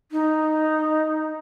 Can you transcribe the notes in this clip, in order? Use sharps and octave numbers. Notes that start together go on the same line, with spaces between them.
D#4